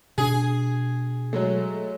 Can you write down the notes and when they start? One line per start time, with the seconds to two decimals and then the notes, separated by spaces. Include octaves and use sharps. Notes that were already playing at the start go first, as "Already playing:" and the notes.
0.18 B2 D4 G#4
1.33 F#3 G#3 A3